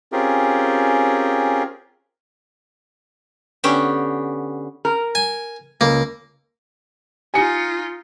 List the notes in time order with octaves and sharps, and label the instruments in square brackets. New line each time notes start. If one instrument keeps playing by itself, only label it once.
[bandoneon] C4 C#4 F4 G4 G#4 A#4
[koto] D3 B3 C#4 G4
[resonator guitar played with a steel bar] A#4
[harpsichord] G#5
[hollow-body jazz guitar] C#2 [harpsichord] A#3
[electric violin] D#4 F4 [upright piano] G#5 C#7